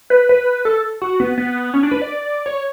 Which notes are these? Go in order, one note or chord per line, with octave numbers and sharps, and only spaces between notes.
B4
B4
A4
F#4
B3
B3
C#4
D4
B4
D5
C#5